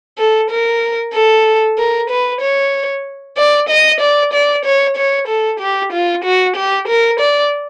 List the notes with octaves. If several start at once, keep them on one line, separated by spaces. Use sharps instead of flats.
A4
A#4
A4
A#4
B4
C#5
D5
D#5
D5
D5
C#5
C#5
A4
G4
F4
F#4
G4
A#4
D5